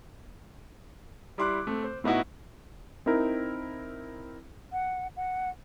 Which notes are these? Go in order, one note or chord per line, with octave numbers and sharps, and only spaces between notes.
G3 E4 C6 D6 F#6
A3 C4
C5
A2 B3 D#4 E4 F#4
C4 D#4 E4 A#4
F#5
F#5